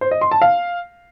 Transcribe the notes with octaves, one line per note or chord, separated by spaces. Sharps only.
C5
D#5
C6
A5
F5